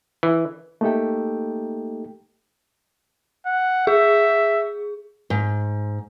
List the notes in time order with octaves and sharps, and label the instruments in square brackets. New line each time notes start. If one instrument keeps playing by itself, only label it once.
[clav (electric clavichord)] E3
[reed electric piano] A3 A#3 D#4 G4 A4 G5
[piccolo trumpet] F#5
[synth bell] G#4 [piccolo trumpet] E5
[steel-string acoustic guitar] G#2